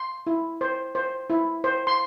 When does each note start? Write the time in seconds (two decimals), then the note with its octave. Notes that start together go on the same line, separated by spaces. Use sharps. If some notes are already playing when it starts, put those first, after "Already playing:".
Already playing: C6
0.27 E4
0.61 C5
0.95 C5
1.30 E4
1.64 C5
1.87 C6